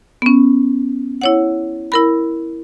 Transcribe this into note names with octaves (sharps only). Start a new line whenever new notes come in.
B3 C#4
E4 C#5 F#5
E4 A#4 B5